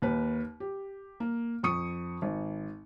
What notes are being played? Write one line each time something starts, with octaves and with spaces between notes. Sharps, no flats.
D#2 A#3 B4
G4
A#3
F2 C#6 D#6 C#7
G#1